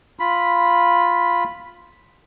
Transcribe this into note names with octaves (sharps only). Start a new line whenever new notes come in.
F4 B5